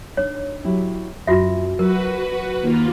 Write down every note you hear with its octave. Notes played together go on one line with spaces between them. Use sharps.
D4 D#4 C#5
F#3 E4 G4
F#2 F4 F#4 E5
F#3 F#4 A#4 B4
D#2 A#3 F4